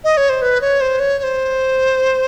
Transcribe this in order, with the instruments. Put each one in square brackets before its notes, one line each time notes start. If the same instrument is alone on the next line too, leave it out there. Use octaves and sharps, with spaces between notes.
[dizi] D#5
C#5
C5
B4
C#5
C5
C#5
C#5
C5